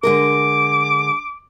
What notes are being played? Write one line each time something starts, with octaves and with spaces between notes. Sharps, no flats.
D3 G#3 A#4 D6